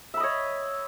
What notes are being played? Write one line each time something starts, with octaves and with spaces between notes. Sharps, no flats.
C#5 D#5 E5 B5